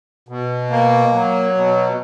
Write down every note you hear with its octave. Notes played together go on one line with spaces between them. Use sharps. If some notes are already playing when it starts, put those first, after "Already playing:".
B2
A#3
F#3
B2